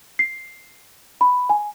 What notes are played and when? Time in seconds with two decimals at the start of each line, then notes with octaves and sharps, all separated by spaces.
0.19 C7
1.21 B5
1.49 G#5